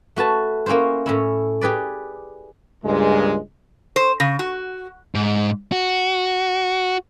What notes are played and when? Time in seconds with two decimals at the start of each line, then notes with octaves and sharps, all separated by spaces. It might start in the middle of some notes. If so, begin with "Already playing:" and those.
0.16 A3 F#4 B4 A5
0.66 A#3 C#4 E4 F#4 C5
1.06 A2 C#4 E4
1.61 G4 G#4 B4 D5
2.85 C#2 G2 A#2 G#3
3.96 C5
4.20 C#3
4.39 F#4
5.15 G#2
5.72 F#4